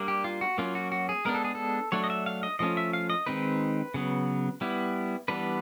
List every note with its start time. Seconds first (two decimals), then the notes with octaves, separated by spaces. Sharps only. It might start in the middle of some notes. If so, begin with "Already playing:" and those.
Already playing: G3 A#3 D4
0.08 G4
0.24 F4
0.41 F#4
0.58 F#3 A#3 C#4 F4
0.75 F#4
0.92 F#4
1.09 G#4
1.25 G#3 B3 D4 A#4
1.35 A4
1.45 G#4
1.55 A4
1.92 F#3 A3 D4 C#5
2.04 D#5
2.10 E5
2.26 F5
2.43 D#5
2.59 F3 A3 C#4 F4 D#5
2.77 E5
2.93 F5
3.10 D#5
3.26 D#3 G#3 C4 D#4 B4
3.94 C#3 F#3 B3
4.61 G3 B3 E4
5.28 E3 G3 B3 D4 B4